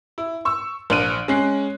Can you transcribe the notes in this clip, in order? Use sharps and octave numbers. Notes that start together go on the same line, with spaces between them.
E4
C#6 E6
A#1 D4 F6 F#6 D7 D#7
G#3 C#4 F#6 C7